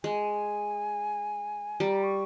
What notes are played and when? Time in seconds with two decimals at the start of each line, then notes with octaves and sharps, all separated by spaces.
0.04 G#3 G#5
1.80 G3 A#5
2.04 C#6